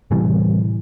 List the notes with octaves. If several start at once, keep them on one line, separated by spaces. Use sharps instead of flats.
A2 C3 E3 G3